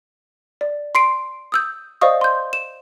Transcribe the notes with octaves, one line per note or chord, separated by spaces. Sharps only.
D5
C6 C7 D7
D#6 E6 G6
C5 D5 D#5 F5 C#6 D#6
C6 G6
E7